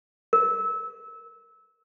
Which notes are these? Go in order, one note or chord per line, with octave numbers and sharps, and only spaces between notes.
A#4